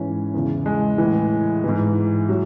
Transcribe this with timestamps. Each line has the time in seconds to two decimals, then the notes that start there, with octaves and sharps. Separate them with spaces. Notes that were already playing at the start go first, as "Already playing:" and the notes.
Already playing: G#2 E3 C#4
0.34 E2 C#3 E3
0.66 G#3
0.98 E3
1.04 A2
1.64 G#2 E3
2.29 E3 F#3